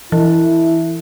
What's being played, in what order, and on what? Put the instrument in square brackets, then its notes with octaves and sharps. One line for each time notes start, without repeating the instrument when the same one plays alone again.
[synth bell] E3 [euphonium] E4